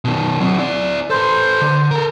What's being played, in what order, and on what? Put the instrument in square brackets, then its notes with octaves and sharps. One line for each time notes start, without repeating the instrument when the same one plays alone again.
[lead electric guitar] B2 D#3
F#3 C4
E4 D5
[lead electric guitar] A4 B4 [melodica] C5
[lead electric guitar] D3
A4 A#4